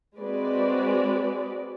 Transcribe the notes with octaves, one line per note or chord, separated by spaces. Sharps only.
G#3 C4 F#4 G#4 B4 D5